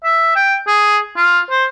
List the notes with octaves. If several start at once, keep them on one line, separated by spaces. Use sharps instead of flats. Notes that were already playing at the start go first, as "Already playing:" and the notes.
E5
G5
G#4
F4
C5